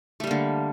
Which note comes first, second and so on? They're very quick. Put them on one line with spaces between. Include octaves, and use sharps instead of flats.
A3 G3 A#3 D3